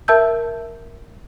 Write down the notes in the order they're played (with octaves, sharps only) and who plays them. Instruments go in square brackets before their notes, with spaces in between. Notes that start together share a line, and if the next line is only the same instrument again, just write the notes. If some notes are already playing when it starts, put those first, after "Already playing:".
[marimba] A#4 E5 A5 E6 G6